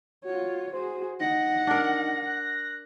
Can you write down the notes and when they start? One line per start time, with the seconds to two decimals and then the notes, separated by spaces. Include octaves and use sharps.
0.25 F4 F#4 C#5
0.73 F#4 G#4 C5
1.20 D#4 F#5 A#6
1.67 D4 A#4
2.26 F#6